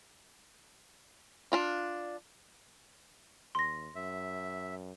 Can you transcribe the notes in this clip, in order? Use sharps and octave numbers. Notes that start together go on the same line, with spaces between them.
D4 F4 D5
D#2 C6 A#6
F#2 E5